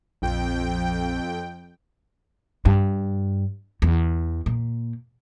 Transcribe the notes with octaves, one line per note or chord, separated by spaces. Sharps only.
A#1 F2 G5
G2
E2
A#2